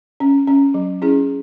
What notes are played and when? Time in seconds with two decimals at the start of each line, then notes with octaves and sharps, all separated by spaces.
0.20 C#4
0.48 C#4
0.74 F#3
1.02 C#4 E4 G#4